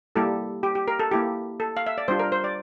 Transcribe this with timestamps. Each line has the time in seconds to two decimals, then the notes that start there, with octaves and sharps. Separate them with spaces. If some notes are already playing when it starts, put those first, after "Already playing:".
0.16 G3 A#3 E4 G4 A4
0.63 G4
0.75 G4
0.88 A#4
0.99 A4
1.12 A#3 E4 G4
1.60 A4
1.77 F5
1.87 E5
1.98 D5
2.08 G3 D4 F4 C5
2.19 A#4
2.32 C5
2.44 D5